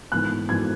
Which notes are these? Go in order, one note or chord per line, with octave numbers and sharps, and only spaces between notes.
G#2 E3 B3 F#6
G#2 E3 B3 G#6